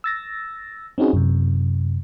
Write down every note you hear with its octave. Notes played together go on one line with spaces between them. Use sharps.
E6 A6 A#6
C4 C#4 D#4 F#4 G#4
F#2 C3